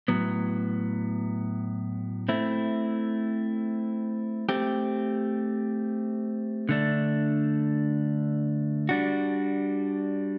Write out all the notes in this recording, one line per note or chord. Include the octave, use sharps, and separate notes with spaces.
A2 F#3 B3
A3 C4 E4
A3 C4 G4
D3 A3 D4
G3 D4 F#4